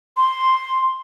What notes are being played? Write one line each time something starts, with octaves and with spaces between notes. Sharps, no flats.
C6